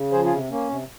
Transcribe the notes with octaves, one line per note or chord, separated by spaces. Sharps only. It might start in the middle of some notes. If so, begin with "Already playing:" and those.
Already playing: C#3
F3 G#4 C5
F4 G#4
C3
A#3 C#4
C3